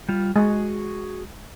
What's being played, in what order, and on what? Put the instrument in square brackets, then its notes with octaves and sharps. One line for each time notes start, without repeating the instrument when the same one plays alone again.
[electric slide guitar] G3 F4
[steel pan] G#3 [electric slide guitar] F#4 G#4